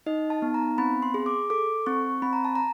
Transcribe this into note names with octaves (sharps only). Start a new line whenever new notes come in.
D#4 D#5
A5
B3
A#5
C4 B5
C6
G#4
D6
A4 D6
C4 C#6
C4 B5
A#5
A5
A#5